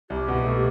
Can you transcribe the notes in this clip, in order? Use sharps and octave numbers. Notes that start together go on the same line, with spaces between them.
C2 G4
B2
A3